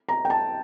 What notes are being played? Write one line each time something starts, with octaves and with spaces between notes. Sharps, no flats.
A#5
G5
A5